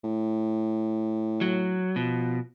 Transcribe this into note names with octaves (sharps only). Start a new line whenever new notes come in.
A2
F#3
B2 F3